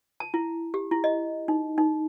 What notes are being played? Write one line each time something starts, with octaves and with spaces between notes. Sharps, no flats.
A5
E4
G4
E4
D#5
D#4
D#4